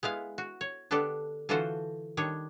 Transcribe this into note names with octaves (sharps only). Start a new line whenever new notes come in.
G#3 B3 E4 F5
F#4
C#5
D3 B3 D4 G4 A4 D5
D3 E3 F4 F#4 A4 C5
D#3 G3 D4 C#5